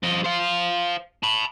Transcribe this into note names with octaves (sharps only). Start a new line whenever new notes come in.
F3 D#5
C5 F5
A5 B5